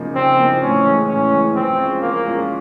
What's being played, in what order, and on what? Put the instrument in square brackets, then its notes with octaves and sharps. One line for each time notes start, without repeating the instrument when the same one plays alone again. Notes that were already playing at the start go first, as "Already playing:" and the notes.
Already playing: [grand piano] C#3 F3 A#3 D#4
[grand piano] C#3 [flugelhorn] C4
[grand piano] F3 A#3 D#4
[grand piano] A2 [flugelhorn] C#4
[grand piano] E3 G#3
[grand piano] A2 [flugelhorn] C#4
[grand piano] E3 G#3
[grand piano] F3 [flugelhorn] C4
[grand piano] G#3 C#4 F4
[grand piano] F3 [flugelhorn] A#3
[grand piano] G#3 C#4 F4